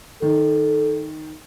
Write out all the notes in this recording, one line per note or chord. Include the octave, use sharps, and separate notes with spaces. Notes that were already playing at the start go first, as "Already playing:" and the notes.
D#3 A4